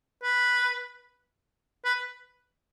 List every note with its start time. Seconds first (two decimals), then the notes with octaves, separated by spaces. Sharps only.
0.23 B4
1.85 B4